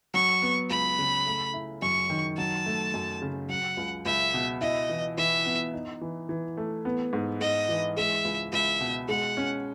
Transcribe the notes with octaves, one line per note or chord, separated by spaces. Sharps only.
F#3 C#6
B3
C#2 B5
C#3
A3
E4
F#2 C#6
D#3
F#3 A5
A3
F#2
C#3
F#3 F#5
C#2
C#2 E5
B2
E4 D#5
E3
E3 E5
B3
D#4
E3
E3
A3
B3
G#2
G#2 D#5
E3
G#3 E5
C#2
C#2 E5
B2
G#3 F#5
C#4